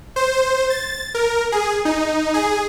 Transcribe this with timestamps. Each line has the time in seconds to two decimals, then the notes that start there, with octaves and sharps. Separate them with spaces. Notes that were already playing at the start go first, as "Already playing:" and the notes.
0.16 C5
0.70 A6
1.14 A#4
1.52 G#4
1.85 D#4
2.34 G#4